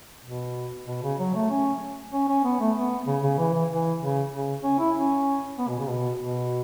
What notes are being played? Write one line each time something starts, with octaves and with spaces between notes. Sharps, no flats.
B2
B2
C#3
F#3
A3
C#4
C#4
C#4
B3
A3
B3
C#3
C#3
E3
E3
E3
C#3
C#3
C#4
E4
C#4
B3
B2
C#3
B2
B2